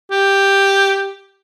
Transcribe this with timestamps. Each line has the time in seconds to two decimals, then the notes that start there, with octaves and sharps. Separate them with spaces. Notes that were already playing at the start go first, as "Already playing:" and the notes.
0.11 G4